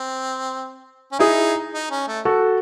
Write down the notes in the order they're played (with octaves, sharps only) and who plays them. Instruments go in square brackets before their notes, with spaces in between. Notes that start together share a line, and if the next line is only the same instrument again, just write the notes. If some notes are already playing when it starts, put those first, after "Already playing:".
Already playing: [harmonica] C4
C#4
[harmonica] D#4 [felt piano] E4 G#4
[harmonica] D#4
C#4
A3
[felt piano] F#4 A4